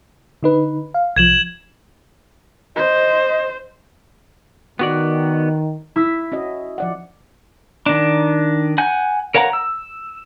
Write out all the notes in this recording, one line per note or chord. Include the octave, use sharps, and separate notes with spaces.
D3 D#4 B4
F5
C2 F3 G#6 E7 F#7
C5 D#5
D#3 B3 F#4 D5
E4 E6 B6
C#4 F#4 D#5
F3 D5 F#5
D#3 D4
F#5 G#5 G6
A#4 C#5 F5 F#5 A#5
E6